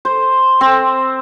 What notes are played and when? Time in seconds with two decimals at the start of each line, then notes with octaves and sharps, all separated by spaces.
0.05 C5
0.61 C4